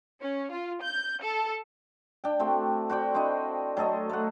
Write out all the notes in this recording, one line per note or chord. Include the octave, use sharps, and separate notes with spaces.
C#4
F4
G6
A4
D4 G5
A3 C4 F#4 E5
F#4 C5 D5 G5
C4 D4 E4 D#5
F#3 A3 A4 D#5
A3 F#5